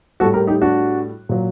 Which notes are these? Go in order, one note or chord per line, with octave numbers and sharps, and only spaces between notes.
A2 G3 F#4 A4
G4 A#4
D#4 G4
D4 F#4
A#2 F#3